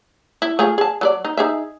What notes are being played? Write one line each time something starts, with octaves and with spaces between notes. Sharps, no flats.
E4
A3 F4 G#4
G#4 A5
F#3 A4 D5
D#4
D#4 G#4 E5